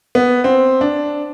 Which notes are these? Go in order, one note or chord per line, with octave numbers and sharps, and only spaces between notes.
B3
C4
D4